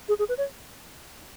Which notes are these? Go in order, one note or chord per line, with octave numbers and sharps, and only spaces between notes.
G#4
G#4
B4
C#5